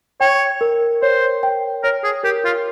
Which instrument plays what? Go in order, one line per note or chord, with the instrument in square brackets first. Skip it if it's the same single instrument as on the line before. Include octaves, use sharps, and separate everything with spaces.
[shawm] C#5 [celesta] G5
[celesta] A#4
[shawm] C5 [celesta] C#5
[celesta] G5
[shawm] A#4 [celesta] C#5
[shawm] G#4
[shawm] G4 [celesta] A#4
[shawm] F4